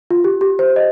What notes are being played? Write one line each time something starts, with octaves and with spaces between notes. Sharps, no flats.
F4
G4
G4
C5
D#5